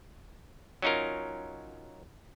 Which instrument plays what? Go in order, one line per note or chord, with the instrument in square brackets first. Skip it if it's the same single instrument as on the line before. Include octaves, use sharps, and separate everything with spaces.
[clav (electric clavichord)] F#3 C#4 D#4 F4 A#4